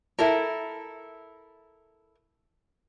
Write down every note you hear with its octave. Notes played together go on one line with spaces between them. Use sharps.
E4 A4 A#4